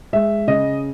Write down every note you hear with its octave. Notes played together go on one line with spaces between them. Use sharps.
G#3 E5
C#3 D#5